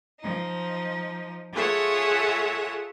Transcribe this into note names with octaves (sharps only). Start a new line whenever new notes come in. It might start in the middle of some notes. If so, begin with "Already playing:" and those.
F3 D#4
F4 G#4 A4 C#5 E5 F#5